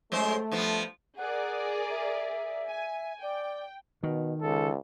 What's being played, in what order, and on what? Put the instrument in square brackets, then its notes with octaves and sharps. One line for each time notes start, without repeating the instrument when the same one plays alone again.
[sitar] F#2 G#3 C5 [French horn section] A3
[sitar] G2 F3 B3
[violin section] G#4 A#4 D5 [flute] F#5
[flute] E5
[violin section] G#5
[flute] D5 [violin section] G5
[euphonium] B2 [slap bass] D#3
[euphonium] C#2 [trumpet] A4